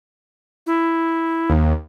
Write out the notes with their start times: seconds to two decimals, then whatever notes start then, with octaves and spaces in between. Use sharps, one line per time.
0.67 E4
1.50 D#2